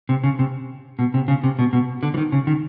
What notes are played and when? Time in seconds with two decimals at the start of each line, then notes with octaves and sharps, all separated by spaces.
0.09 C3
0.24 C#3
0.39 C3
0.99 B2
1.14 C3
1.28 C#3
1.44 C3
1.59 B2
1.73 B2
2.03 D3
2.14 E3
2.18 D#3
2.32 C#3
2.47 D#3